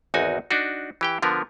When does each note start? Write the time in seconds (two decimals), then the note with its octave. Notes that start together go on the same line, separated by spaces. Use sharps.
0.14 G#1 E2 D#4 F#4 G#5
0.51 D4 D#4 F#4
1.01 E3 G4 G5
1.22 D3 F3 B3 A#4